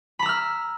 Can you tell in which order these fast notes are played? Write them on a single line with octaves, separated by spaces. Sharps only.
B5 A#5 E6 F6